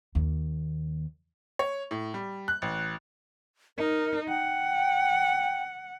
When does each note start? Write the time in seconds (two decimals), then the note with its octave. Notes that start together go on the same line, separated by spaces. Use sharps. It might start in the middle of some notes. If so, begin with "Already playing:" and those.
0.15 D#2
1.59 C#5
1.91 A2
2.14 G3
2.48 F#6
2.62 A1
3.78 D#4 A#4
4.29 F#5 G5